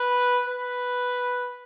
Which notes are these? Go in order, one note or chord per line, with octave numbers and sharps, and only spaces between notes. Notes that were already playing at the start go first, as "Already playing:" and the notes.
Already playing: B4
B4